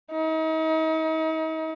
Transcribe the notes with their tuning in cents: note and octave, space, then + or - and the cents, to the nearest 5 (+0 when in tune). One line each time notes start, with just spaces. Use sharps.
D#4 +40